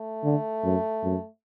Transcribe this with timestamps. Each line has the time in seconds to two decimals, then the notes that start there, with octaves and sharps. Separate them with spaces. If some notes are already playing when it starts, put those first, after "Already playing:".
Already playing: A3
0.24 D3
0.64 F#2
1.03 F#2